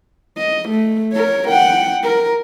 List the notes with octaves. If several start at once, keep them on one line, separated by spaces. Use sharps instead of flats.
D#5
A3
A#4 C#5
F#5 G5
A#4